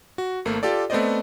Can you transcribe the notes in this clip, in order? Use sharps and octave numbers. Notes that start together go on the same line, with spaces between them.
F#4
G#1 A3 A#3
F4 G4 A4 D5
A3 B3 C4 C5 D5 D#5